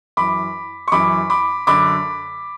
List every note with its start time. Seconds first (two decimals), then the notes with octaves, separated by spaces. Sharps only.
0.17 F#2 E3 B5 D6
0.88 C#6
0.92 F#2 E3 B5 D6
1.30 B5 D6
1.67 F#2 D3 B5 D6